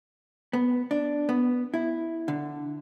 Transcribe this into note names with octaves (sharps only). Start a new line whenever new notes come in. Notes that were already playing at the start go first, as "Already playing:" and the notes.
B3
D4
B3
E4
D3